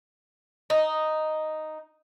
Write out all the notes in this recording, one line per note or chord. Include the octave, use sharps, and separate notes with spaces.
D#4